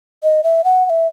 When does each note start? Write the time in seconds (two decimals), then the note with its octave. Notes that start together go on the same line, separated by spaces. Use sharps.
0.23 D#5
0.44 E5
0.64 F#5
0.85 F#5
0.90 E5